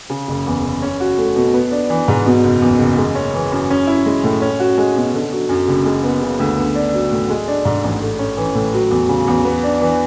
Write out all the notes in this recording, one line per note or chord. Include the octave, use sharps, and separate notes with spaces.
C#3
F#1
E2
F#1
C#4
F#4
A3
B2
B3
D4
E3
G#2
B2
F#1
E2
F#1
G#3
C#4
E3
F#2
C#4
E4
G#3
A2
C#4
F#4
G#3
B2
D3
F#3
F#2
F#1
G#3
B3
C#3
D2
B3
D4
F#3
A2
G#3
D4
G#2
A1
A3
C#4
E3
A2
F#3
E2
C#3
E2
B3
D4
E3